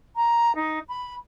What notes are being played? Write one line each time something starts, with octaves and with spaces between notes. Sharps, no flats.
A#5
D#4
B5